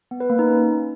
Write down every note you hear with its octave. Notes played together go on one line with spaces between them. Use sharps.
B3
B4
A#3
D#4
C#4